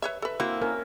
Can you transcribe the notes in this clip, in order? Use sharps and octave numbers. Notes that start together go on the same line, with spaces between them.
B4 C#5 E5
A4 B4 E5
A#3 C4 E4 F#4
C#4 A#4